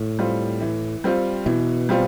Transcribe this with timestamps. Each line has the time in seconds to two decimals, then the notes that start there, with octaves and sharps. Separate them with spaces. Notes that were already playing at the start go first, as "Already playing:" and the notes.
Already playing: A2
0.19 G3 C4 F4
0.61 E3
1.04 G3 C4 F4
1.46 B2 E3
1.89 G3 C4 F4